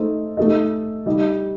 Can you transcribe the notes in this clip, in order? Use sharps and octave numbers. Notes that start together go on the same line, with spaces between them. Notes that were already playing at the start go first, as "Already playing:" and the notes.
Already playing: A3 D#4 A4 C5
A3 D#4 A4 D#5
G3 D#4 G4 D#5